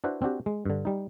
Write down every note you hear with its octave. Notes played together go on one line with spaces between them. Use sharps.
D4 E4 F#4 B4 C5
C4 D4 F#4 G4
G#3
G2 D3
G3 D#4